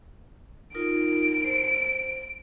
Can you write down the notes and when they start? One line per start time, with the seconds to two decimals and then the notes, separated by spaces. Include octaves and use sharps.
0.74 D#4 F4 A#4 D7
1.44 C5